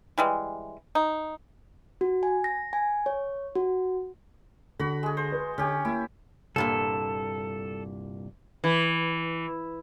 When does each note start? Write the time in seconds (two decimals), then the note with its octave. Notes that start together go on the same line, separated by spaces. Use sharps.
0.18 E3 G3 G#3
0.95 D#4
2.01 F#4
2.23 G#5
2.44 A#6
2.73 G#5
3.06 C#5
3.55 F#4
4.79 D3 F#4 B5
5.03 G#3 G#4
5.17 C5
5.32 B4
5.58 D3 C#4 G4
5.85 A#3 E4
6.56 C2 G2 A#2 A4
8.64 E3